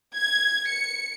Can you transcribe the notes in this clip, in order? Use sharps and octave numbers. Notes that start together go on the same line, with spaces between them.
G#6
C#7